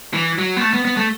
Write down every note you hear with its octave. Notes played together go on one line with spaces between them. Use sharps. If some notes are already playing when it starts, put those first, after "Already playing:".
E3
F#3
B3
A3
B3
B3
A3